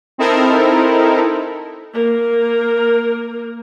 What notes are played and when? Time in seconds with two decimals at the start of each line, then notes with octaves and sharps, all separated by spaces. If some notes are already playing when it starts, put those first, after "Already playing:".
0.18 C4 D#4 E4 A4 A#4
1.93 A#3 A#4